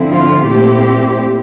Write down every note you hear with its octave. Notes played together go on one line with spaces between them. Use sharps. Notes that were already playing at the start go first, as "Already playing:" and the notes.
Already playing: D3 F3 C4 E4
F4
A#2 A3 C4 E4 G4